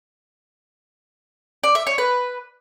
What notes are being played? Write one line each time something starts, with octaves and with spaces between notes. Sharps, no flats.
D5
E5
C#5
B4